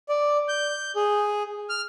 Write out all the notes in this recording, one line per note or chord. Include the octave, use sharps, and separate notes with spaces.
D5
G6
G#4
F6